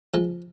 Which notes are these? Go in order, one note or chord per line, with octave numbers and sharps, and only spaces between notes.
F3 G#3